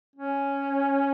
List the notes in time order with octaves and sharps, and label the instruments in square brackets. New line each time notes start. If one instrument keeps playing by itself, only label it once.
[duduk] C#4